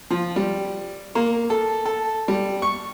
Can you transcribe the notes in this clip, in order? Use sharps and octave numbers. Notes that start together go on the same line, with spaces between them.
F3
G3
A#3
A4
A4
G3
C#6